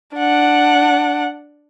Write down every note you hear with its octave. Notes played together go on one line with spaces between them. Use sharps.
D4 F#5